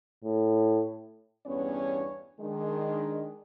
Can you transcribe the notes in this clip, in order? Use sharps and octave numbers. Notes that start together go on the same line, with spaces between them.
A2
E2 G2 B3 C#4 D4 C#5
D#3 G#3 D4